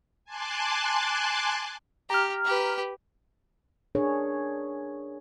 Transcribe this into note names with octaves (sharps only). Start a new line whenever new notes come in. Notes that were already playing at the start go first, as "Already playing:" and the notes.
G#5 A5 C6 D6 F#6
G4 A#5 F6
G4 B4
D4 G#4 A#4 C#5